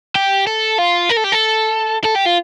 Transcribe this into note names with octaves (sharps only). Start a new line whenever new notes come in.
G4
A4
F4
A#4
A4
G4
A4
A4
G4
F4